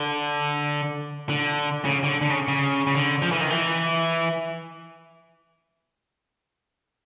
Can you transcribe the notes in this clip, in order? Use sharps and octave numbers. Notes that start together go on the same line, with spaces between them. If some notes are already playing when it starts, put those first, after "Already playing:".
Already playing: D3
D3
C#3
D3
D3
C#3
C#3
C#3
D3
F3
E3
D#3
E3